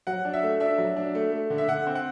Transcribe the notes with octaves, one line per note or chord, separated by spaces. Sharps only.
F#3 F#5
D4
E5
A3
D4 E5
F#3
D4
A3
A3
D3
E5
D3 F#5
C4
F#5